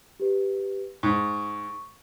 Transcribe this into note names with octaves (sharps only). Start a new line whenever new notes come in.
G4 B4
G#2 C#6